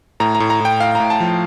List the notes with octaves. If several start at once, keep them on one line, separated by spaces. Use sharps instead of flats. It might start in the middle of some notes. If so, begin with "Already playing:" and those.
A2 A#5
A#5
A2
A#5
A2 G5
A2 F5
A2 A#5
A5
F3